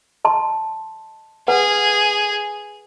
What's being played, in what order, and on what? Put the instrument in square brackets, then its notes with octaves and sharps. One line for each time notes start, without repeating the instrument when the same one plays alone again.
[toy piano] D#5 A5 C6
[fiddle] G#4 [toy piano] B4 F#5